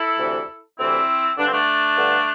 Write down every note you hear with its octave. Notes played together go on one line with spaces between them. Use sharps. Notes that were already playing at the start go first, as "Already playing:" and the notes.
Already playing: E4 A4
D2 C3 E3
D2 C3 E3 C4 E4
G2 D3 D4
C4
A3 D4
G2 D3